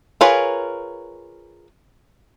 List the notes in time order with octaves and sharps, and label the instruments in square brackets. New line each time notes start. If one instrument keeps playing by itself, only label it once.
[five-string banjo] F4 G#4 A#4 B4 C#5